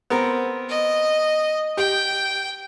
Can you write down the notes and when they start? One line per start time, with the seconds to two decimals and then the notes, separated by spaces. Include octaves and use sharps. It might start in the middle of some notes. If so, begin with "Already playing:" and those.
0.10 B3 C4 A#4
0.69 D#5
1.77 G4 G5